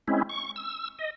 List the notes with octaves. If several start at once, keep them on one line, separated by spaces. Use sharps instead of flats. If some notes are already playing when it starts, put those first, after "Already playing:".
G#3 C4 C#4 E4
C#6
E6
D#5